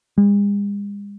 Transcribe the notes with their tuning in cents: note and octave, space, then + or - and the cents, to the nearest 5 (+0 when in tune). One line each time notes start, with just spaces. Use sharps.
G#3 -45